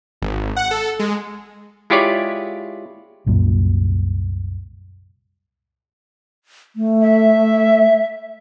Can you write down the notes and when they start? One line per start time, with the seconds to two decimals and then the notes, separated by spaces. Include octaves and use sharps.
0.22 G#1
0.56 F#5
0.71 A4
0.99 G#3
1.90 G#3 E4 F4 G4 C#5 D5
3.26 C2 F#2 A#2
6.76 A3
7.01 E5